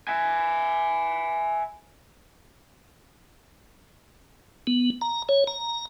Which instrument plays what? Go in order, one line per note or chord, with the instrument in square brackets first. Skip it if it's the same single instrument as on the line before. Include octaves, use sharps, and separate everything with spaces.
[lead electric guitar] E5 G#5
[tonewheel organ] B3
A#5
C#5
A#5